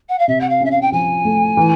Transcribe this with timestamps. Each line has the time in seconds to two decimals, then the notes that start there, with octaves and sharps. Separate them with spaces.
0.09 F#5
0.19 F5
0.28 C3 E5
0.41 F#5
0.50 F5
0.61 C#4 E5
0.71 F5
0.81 G5
0.92 F3 G#5
1.25 A3
1.57 E3